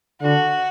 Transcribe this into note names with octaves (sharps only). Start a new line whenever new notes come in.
D3 F#4